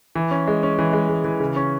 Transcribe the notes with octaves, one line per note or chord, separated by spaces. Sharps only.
E3
C#4
G#3
C#4
E3
G#3
G#3
E3
C#3
C#4